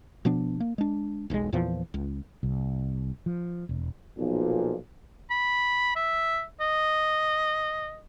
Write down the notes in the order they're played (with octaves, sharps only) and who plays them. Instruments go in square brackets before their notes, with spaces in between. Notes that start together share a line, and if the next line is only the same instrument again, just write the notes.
[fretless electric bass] B2 F3 B3 D4
A#3
G#3 D4
E1 B1 B2 G#3
E2 A#2 E3 F3
C#2
C2
F3
E1
[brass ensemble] B1 A#2 F3
[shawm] B5
E5
D#5